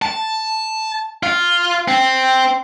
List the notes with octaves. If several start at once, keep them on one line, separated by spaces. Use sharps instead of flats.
A5
F4
C4